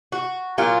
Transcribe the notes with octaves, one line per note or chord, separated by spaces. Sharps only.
F#4
A#2 F#3 A#3 F4